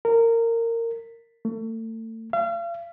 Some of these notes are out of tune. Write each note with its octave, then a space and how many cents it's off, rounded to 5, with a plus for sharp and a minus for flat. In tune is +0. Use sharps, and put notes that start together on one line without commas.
A#4 -20
A3 +35
F5 -40